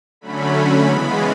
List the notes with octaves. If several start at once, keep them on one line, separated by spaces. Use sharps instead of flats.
D3 F#3 A3 C#4 B5
B5
C#3 E3 G#3 B3